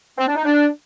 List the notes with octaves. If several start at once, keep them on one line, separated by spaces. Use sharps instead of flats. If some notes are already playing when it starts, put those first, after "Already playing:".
C4
D4
D#4
D4